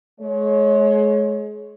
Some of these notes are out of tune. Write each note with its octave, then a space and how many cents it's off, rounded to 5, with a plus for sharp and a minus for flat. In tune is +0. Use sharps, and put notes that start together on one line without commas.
G#3 +35 C#5 +0